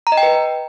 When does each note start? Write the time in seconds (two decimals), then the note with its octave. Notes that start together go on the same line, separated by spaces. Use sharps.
0.07 A#5
0.12 D#5
0.17 G5
0.23 B4